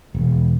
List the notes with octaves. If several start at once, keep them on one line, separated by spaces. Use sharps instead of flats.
E1